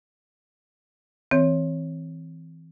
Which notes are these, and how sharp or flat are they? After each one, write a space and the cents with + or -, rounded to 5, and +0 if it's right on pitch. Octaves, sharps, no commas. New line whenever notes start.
E3 -25 C4 +0 C#5 +0